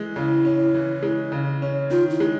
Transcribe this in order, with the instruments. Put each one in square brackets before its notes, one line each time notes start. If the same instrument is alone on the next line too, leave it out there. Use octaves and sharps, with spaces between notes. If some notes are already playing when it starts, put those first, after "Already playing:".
Already playing: [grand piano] E3 G#3
[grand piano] C#3 [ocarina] E4
[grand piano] C#4
E3
G#3
C#3
C#4
[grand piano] D#3 [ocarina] F4
[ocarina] E4
[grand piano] G#3